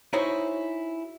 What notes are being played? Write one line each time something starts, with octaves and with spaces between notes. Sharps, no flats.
D#4 E4 F#4 G#4 C5 C#5